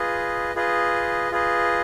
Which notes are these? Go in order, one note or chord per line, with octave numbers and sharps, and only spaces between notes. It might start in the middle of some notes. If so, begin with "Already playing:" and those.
Already playing: F4 G#4 B4 D#5
F4 G#4 B4 D#5
F4 G#4 B4 D#5